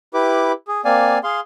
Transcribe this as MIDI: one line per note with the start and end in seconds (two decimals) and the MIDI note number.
0.14 0.52 64
0.14 0.52 67
0.14 0.52 71
0.14 0.52 86
0.68 0.81 68
0.85 1.18 58
0.85 1.18 60
0.85 1.18 74
0.85 1.18 77
0.85 1.18 80
1.24 1.40 68
1.24 1.40 77
1.24 1.40 84